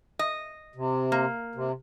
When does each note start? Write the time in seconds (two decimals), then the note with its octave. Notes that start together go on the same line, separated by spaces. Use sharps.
0.19 D#5
0.75 C3
1.12 A#3
1.55 C3